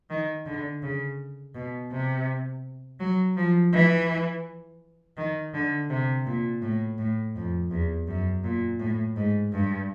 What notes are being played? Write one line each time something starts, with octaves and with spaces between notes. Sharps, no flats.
D#3
D3
C#3
B2
C3
F#3
F3
E3
D#3
D3
C3
A#2
A2
A2
F2
E2
F#2
A#2
A2
G#2
G2